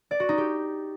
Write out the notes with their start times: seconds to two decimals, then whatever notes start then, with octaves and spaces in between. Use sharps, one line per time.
0.11 D5
0.20 F#4
0.29 D#4
0.38 G4